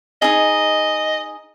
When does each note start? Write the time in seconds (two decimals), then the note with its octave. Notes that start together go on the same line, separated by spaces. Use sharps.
0.22 D#4 G#4 D#5